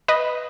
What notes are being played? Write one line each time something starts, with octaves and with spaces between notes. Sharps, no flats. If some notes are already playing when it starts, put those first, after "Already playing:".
B4 D#5